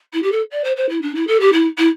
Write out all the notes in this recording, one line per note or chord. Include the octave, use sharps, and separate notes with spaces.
E4
G4
A4
D5
C5
C5
E4
D4
E4
A4
G4
E4
E4